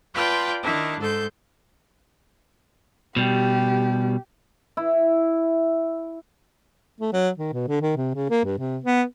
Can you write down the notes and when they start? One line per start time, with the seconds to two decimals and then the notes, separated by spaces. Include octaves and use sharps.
0.13 F4 B4 D5 G5 A5 C6
0.62 D#3 D4 E4
0.99 G#2 A4 C6 G6
3.16 B2 G3 G4
4.77 E4
7.01 A3
7.13 F#3
7.38 D#3
7.53 B2
7.68 D3
7.82 D#3
7.97 C3
8.15 C#3
8.30 A#3
8.45 G2
8.59 C3
8.84 B3